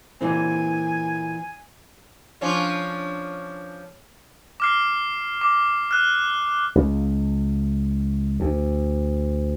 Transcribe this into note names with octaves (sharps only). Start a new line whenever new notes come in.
A#2 E3 C4 G#5
F3 C#4 D4
D6 F6 C7
D6
F6 F#6
C#2
D2